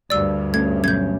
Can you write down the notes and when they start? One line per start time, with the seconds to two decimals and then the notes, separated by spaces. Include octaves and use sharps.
0.10 D2 G2 D5 E6
0.54 A3 C#4 G#6
0.84 B2 F#3 C#4 G6 G#6